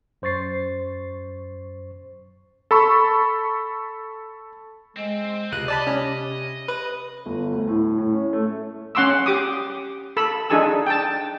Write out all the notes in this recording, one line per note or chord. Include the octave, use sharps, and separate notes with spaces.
F#2 C5 C#6 A6 C7
A4 B5 C#6
G#3 C4
C#2 C3 D#5 F#6
D5 A5 B5
C#4
B4
G1
D2
A2
A2
C#4
A3
C#4 F#5 C6 D6 E6
G4 D6 D#6
A4 B5 E6
D4 D#4 G#4 A4 G#5 E6
G5 A5